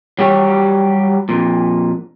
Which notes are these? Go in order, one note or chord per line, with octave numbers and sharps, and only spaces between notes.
F#3 G3 G4 C#5
F2 A#2